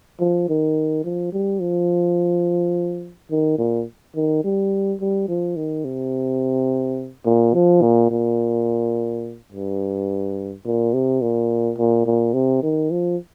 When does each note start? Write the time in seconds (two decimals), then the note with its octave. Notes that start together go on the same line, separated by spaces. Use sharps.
0.20 F3
0.49 D#3
1.04 F3
1.33 G3
1.61 F3
3.31 D#3
3.58 A#2
4.16 D#3
4.44 G3
5.01 G3
5.28 F3
5.56 D#3
5.85 C3
7.25 A#2
7.54 F3
7.82 A#2
8.11 A#2
9.52 G2
10.65 A#2
10.94 C3
11.22 A#2
11.78 A#2
12.06 A#2
12.34 C3
12.63 D#3
12.91 F3